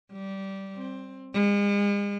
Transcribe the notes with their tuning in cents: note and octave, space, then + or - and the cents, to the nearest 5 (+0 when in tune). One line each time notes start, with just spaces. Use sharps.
G3 -15
C4 +15
G#3 -40